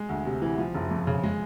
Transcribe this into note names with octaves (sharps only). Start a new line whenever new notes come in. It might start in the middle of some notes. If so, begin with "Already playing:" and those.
Already playing: G#3
D2
C3
E3
F3
F#1
F2
C#3
G#3